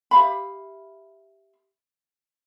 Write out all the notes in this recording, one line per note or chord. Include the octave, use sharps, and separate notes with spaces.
G4 E5 F5 B5